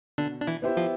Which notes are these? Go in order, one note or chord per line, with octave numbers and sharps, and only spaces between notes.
B2 D3 D4
D4
E3 E4
B3 E4 G4 C5
F3 F4